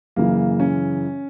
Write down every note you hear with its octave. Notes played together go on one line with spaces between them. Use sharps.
F#2 C#3 E3 A#3
C#4